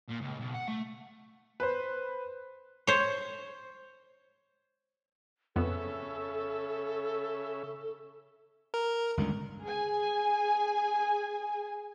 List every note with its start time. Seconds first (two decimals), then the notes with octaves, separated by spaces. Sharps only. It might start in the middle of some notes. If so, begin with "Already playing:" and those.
0.10 A#2
0.22 C#2
0.40 B1
0.55 F#5
0.68 A3
1.60 B4 C5
2.87 C5 C#5
5.56 F2 C#3 B3 A4 E5
8.74 A#4
9.17 G1 C#2 D3
9.62 G#4 G#5